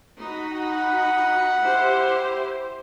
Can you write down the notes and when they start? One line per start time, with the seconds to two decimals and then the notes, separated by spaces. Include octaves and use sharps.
0.21 D#4 F#4 B5
0.53 F#5
1.62 E4 G4 C5